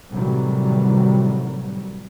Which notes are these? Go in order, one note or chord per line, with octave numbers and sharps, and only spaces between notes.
A2 C3 D#3 E3 F#3 G3